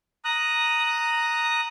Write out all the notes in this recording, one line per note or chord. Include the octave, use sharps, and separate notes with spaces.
A#5 D#6 F#6